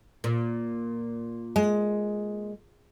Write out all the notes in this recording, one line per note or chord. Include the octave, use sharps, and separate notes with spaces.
A#2
G#3